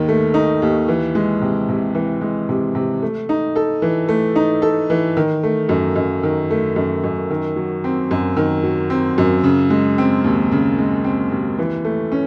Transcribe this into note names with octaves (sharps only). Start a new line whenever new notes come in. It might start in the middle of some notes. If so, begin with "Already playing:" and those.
Already playing: D#2 D#3
A3
D#4
D#2
E3
G#3
C3
C3
E3
G#3
C3
C3
A3
D#4
A4
E3
A3
D#4
A4
E3
D#3
A3
F#2
F#2
D#3
A3
F#2
F#2
D#3
F#3
C4
F#2
D#3
F#3
C4
F#2
C#3
G#3
C4
D#2
C#3
G#3
C4
D#2
E3
A3
C#4